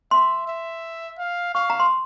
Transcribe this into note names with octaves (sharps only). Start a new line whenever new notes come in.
E5 C6
E5
F5
F5 C#6
A#5
C6